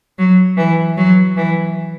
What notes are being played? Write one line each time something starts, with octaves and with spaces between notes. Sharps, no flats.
F#3
E3
F#3
E3